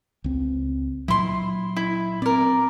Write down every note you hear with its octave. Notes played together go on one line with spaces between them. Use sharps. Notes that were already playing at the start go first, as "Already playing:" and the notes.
C#2 C4
A#2 F#3 E4 C6
E4
C4 A#4 D5